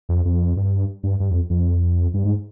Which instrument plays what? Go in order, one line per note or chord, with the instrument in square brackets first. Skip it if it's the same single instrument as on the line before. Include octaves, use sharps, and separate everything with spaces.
[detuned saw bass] F2
F2
G2
G2
G2
F2
F2
G2
G#2